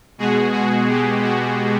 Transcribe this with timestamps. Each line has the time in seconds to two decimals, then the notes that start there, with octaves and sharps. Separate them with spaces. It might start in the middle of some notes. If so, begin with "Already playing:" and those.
0.18 B2 G#3 B3 F#4 G#4
0.53 F#4 G#4
0.89 G4
1.23 F#4